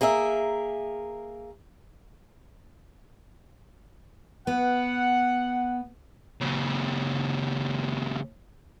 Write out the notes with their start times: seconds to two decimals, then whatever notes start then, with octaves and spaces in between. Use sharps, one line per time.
0.01 A#3 G#4 A#4 E5
4.47 B3 F#5
6.41 A#2 C#3